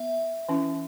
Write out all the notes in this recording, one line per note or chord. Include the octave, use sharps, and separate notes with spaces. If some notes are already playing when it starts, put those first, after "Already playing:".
Already playing: B3 E5
E3 C#4 E4